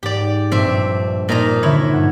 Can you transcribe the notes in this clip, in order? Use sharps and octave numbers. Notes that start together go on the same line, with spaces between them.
G#2 G4 D5
A#1 G2 C4 E5
A#2 D#4 A#5
D3 D#3 E4 C#5 E5
G2 F#5 G#6